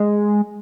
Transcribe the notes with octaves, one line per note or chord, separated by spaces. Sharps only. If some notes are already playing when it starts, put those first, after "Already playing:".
Already playing: G#3